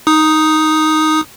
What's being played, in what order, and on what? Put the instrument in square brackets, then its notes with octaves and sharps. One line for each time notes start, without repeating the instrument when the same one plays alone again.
[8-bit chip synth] D#4 D#6